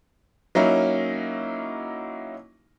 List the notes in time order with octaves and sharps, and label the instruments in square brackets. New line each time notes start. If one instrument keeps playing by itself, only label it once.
[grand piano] F#3 A#3 C#4 D#4 E4